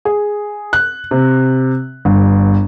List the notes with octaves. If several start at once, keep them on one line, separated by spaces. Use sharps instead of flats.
G#4
F#6
C3
G1